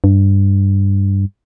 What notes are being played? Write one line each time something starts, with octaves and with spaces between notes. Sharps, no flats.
G2